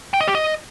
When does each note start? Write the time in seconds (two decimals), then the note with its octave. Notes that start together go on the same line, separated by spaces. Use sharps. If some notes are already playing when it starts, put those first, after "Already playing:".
0.14 G5
0.21 D#5
0.28 G4
0.35 D#5